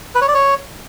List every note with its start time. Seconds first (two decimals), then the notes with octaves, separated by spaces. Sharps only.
0.15 B4
0.21 C#5
0.28 D5
0.34 C#5